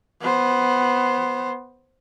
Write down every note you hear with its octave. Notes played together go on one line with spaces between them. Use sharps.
B3 C5